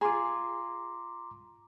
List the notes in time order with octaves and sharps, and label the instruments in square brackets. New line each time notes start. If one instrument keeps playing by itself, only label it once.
[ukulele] F4 G#4 [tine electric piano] A#5 C6 D6